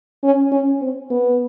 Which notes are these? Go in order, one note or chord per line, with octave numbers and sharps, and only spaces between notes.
C#4
C#4
C4
B3